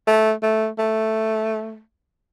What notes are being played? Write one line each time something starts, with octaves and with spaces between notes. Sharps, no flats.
A3
A3
A3